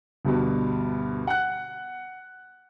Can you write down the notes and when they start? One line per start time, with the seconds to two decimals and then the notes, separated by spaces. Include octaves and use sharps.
0.25 D2 G2 B2
1.27 F#5 F#6